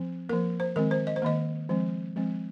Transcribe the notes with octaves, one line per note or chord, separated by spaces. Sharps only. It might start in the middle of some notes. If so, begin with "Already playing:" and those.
Already playing: F3 C4
F3 A#3 A#4
C5
D#3 G#3 C4 A#4
C5
D#5
C5
D#3 A#3 D#5
F3 G#3 C4
F3 G#3 C4